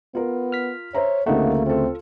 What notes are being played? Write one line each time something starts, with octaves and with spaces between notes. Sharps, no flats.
B3 F4 A#4
F6 B6
C5 C#5 E5 A#5
D2 C#3 A3 A#3 C4 D#4 F#5
C4 F4 A4